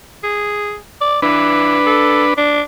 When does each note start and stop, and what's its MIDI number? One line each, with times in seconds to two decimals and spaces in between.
0.23 0.77 68
1.01 1.22 74
1.22 1.79 52
1.22 2.34 62
1.22 2.34 71
1.86 2.24 69
2.37 2.62 62